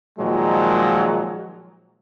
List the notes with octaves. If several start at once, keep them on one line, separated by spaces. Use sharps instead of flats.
A#2 D#3 F3 F#3 G#3